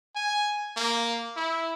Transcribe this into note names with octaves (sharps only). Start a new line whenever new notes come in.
G#5
A#3
E4